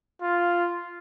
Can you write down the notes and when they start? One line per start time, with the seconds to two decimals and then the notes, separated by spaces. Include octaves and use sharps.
0.22 F4